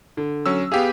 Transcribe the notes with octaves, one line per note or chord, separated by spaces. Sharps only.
D3
F#3 C#4 E6
B3 G4 G#4 F5